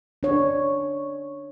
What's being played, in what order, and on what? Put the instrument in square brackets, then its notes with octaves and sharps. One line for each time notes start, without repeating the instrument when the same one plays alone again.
[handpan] D4 C#5